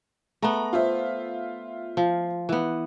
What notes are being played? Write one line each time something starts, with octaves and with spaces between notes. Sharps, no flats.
A3 B3 A#5
F4 C5 E5
F3
E3 B3